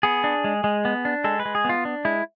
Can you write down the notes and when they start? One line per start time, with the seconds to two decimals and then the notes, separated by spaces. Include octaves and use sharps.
0.03 B3 G#4
0.24 D4
0.44 G#3
0.64 G#3
0.85 B3
1.05 D4
1.24 G#3 A4
1.40 B4
1.45 G#3
1.55 G#4
1.65 B3 F4
1.85 D4
2.05 G#3 E4